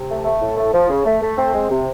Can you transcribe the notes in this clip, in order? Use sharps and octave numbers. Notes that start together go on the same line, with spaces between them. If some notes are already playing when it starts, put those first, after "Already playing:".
Already playing: C3
A3
A3
A2
A3
F3
C#3
A3
A3
C4
G#3
C3